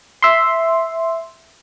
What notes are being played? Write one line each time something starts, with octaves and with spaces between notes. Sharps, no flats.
E5 C6